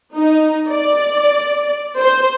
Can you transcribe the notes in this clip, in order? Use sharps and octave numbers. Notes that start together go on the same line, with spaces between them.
D#4
D5
C5